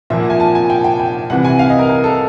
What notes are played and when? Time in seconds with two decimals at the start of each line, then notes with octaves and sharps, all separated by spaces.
0.10 A#2 F3 A#3 E5
0.20 F#5
0.30 G#5
0.40 A5
0.55 G#5
0.70 G5
0.84 G5
1.00 G5
1.30 C2 C3 E3 F#5
1.45 G#5
1.59 F5
1.70 D#5
1.79 A#4
1.89 A#4
2.04 A4